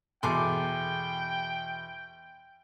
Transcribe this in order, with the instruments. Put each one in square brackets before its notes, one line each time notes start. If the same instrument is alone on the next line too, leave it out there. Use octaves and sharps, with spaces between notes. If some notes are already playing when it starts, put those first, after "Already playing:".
[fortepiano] E2 B2 C6 [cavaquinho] G#4 A4 D6 [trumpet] G5